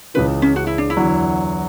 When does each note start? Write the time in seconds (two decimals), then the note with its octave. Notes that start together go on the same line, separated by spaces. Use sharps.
0.14 C#2 C#3 E3 B4
0.42 C#4
0.56 F#4
0.67 E4
0.78 D4
0.90 E4
0.97 E2 D3 F#3